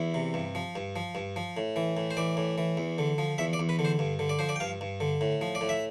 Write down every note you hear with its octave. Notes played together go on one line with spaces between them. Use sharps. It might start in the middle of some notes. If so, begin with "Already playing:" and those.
Already playing: E2 E4
C3
G2
F3
G2
F3
G2
F3
A2
E3
A2
C5
E3 D5
A2
E3
E2
D3
F3
E2 E5
D5
E2
B4
D3
C5
G2
D3
D5
F3 C5
D5
G5
G2 F5
G2
D3
A2
F3
D5
A2
E5